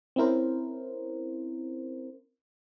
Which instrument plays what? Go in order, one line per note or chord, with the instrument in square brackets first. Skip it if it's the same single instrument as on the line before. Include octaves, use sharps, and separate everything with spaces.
[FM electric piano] C4 C#4 E4 A#4 C5